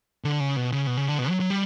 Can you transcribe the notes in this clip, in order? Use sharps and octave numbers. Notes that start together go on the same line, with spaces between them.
D3
C#3
B2
C#3
B2
C#3
D3
B2
F#3
F#3
G3